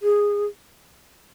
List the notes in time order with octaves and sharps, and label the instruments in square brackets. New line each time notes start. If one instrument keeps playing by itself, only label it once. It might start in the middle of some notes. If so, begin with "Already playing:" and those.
[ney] G#4